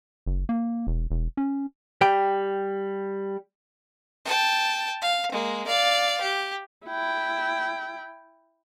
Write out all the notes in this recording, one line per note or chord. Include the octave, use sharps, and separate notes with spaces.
F#1
A#3
E1
E1
C#4
G3 G4 G5
G5 A5
F5
G#3 A#3
D5 F5
G4
E4 G5